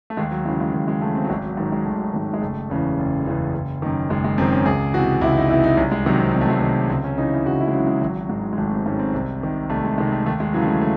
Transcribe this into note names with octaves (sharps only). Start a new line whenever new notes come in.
A3
D#2 G#3
F#3
C#3 E3 G#3
G#3
D#2 F#3
G#3
C#3 E3 A3
C4
F#3
G#1 G#3
F#3
G#2 D#3 F#3
G#3
G#1 A3
G#2 D#3
G#3
F#1 A3
E2 C#3 E3
F#1
E2 C#3 E3
F#1
F#2 D#3
F#1 G#3
G#3
F#2 D#3 C4
C#4
C#2 G#4
C3 E3 F#4
C#2 E4
D#4
C3 E3 E4
D#4
C2 C#4
G#3
C3 D#3 F#3
C4
C2 C4
A3
G#3
A3
C3 D#3
C#2 C4
C#4
C#3 E3 D#4
E4
C#2 F#4
E4
G#3
C#3 E3 F#3
G#3
G#1 F#3
G#2 D#3 G#3
G#3
G#1 A3
C4
G#2 D#3 C#4
C4
C2
C3 D#3
C2 A3
G#3
C3 D#3 G#3
A3
D#2 A3
G#3
C#3 E3 F#3
A3
G#3
A3